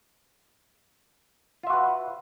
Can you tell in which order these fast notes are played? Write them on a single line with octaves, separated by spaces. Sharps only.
F4 E5 F#4 B4